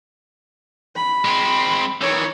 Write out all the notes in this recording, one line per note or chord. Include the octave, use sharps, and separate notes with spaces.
B5
G#3 C4
D#3 E3 C#5